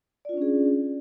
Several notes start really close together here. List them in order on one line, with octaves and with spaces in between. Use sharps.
D5 F4 D4 C#4 G#4